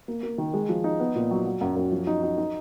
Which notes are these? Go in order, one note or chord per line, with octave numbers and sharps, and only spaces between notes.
A#3
A#3
D#3
G#3
F3
D#4
B3
A#2
F#3
F#3
F#2
F#2
F3
D#4
D#4
D#4